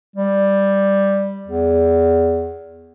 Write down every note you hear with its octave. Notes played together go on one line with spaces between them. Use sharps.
G3
E2